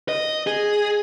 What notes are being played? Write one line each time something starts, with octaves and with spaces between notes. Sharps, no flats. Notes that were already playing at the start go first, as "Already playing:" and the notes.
D#5
G#4